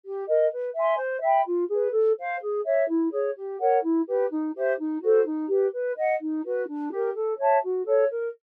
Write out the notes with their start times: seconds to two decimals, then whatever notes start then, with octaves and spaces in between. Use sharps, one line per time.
0.03 G4
0.27 A#4 D#5
0.51 B4
0.74 E5 G#5 C6
0.97 C5
1.21 E5 G5 B5
1.46 F4
1.69 G#4 B4
1.92 A4
2.17 C5 F5
2.40 G#4
2.64 C#5 E5
2.88 E4
3.11 G#4 C#5
3.36 G4
3.59 A#4 C#5 F#5
3.82 E4
4.06 G4 B4
4.30 D#4
4.53 G4 C5 E5
4.77 D#4
5.01 F#4 A4 C5
5.24 D#4
5.48 G4 B4
5.72 B4
5.96 D#5 F#5
6.19 D#4
6.44 F#4 B4
6.67 D4
6.90 G4 A#4
7.14 A4
7.38 C#5 E5 A5
7.62 F#4
7.85 A4 C#5
8.09 A#4